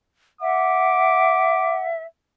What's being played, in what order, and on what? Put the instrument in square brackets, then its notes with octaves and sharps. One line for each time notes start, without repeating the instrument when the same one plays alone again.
[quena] E5 [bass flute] F#5 [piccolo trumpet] D6